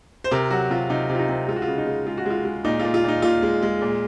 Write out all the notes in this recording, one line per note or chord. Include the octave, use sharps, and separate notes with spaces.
C5
C3 A#4
F#3 F#4
C3 F4
C3 D#4
C3
F4
D#4
C3
G#3 F4
F#4
F4
C#3
D#4
G#3
G#3 F4
F#4
G#3 F4
G#3
A#2 D#4
A#2 F4
F4
A#2 D#4
A#2 F4
G#3
G#3
A#2